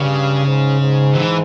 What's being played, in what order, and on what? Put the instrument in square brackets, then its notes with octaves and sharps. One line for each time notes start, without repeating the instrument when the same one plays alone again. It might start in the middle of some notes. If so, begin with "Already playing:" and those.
Already playing: [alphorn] G2 [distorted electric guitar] C#3
[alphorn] G#2
G#2
[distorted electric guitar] E3